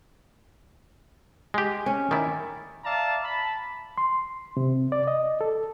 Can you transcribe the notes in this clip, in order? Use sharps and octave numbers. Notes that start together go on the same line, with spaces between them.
G#3 G4
C#4
D#3 E4 D5
D5 E5 F5 A5 A#5
A5 B5
C6
C3
D5
D#5
A4